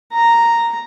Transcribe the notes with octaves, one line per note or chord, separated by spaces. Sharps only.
A#5